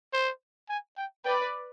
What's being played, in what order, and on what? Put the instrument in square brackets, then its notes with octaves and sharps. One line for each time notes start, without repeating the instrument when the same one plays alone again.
[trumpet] C5
G#5
G5
[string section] B4 D5 [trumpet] G5